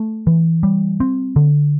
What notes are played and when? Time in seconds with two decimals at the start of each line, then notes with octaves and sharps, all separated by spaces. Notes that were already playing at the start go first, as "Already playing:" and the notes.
Already playing: A3
0.27 E3
0.63 G3
1.00 C4
1.36 D3